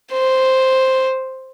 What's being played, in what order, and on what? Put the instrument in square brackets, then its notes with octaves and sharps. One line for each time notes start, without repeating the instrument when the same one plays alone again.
[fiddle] C5